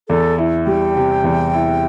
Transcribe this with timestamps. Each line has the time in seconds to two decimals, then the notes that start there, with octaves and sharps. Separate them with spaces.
0.09 E2 A4
0.38 E4
0.66 G3 G5
0.96 C3
1.24 E2
1.54 E4